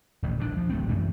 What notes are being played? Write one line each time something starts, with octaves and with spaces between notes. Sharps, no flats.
D#1 A1
D#1 A#1 B2 D4
F3
D1 B1 A3 C4
E1 F#2 A2 E3